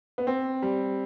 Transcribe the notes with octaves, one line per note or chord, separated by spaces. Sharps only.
B3
C4
G3